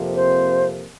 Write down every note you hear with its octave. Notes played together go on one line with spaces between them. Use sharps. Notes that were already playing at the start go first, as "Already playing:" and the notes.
Already playing: F2 C3 F3 A#3
C5